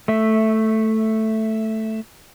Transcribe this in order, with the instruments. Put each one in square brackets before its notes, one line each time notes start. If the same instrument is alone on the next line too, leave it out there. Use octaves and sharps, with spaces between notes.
[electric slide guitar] A3 E5